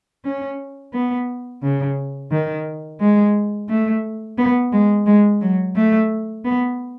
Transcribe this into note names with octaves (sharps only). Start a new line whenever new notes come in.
C#4
B3
C#3
D#3
G#3
A3
B3
G#3
G#3
F#3
A3
B3